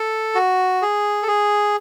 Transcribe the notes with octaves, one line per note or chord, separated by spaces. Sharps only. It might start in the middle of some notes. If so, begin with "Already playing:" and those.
Already playing: A4
F#4
G#4
A4
G#4